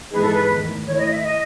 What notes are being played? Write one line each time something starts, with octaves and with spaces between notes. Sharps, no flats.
G#2 E3 B3 D#4 G#4 B4
A4
B4
E2 D#3 A3
D#3 A3 E4 C#5
D#5
E5
D#5